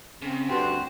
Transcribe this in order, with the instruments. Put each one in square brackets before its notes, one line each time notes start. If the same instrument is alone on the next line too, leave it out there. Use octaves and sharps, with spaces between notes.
[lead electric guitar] C#3 [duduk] C4
[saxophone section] D2 G2 [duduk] F#4 [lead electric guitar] G5 C6